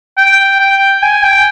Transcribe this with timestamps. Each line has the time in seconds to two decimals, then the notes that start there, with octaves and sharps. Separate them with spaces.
0.17 G5
0.60 G5
1.02 G#5
1.23 G5